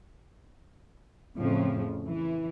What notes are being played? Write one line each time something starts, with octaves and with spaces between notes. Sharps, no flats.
F2 A2 C#3 F3
E3